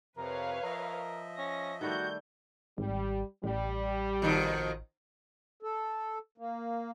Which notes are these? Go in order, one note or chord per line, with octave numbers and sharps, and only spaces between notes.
F2 C3 F3 A#4 B4 C#5 F5
F3 A#4 D#5 E5
C#4 A#6
D#3 G3 A3 F#4 G6
G#1 G3
A1 G3
F2 B2 D#3
A4
A#3